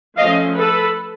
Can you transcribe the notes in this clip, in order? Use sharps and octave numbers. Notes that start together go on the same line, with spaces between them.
F3 A3 C#4 D#5 F5
A4 B4